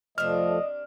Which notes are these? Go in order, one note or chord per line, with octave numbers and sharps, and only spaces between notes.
F2 C3 F3 A3 D4 D#5 F6